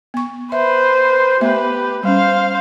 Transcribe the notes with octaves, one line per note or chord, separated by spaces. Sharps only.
B3 C#6
B4 C5 E5
A3 B3 G4 B4 E5
G3 C#4 C5 F5